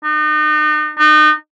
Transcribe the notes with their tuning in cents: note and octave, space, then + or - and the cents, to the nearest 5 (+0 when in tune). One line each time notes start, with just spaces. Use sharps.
D#4 -40
D#4 -35